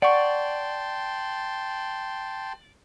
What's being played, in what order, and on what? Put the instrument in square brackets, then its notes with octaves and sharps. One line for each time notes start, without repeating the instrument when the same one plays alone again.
[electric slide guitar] D5 [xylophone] F#5 C#6 [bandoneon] G5 A5 C6